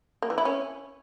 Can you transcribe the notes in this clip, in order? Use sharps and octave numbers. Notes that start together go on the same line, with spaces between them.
A#3
E3
E4
C#4